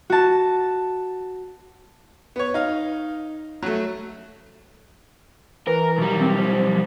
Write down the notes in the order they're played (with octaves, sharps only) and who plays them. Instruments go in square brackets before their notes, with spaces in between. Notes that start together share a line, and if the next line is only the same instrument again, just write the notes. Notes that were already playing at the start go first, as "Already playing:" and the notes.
[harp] F#4 A5
[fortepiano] B3 C#5
D#4 F5
F#3 A3
[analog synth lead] E3 [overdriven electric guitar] A#4
[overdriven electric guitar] B1 G3
[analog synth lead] C4
F3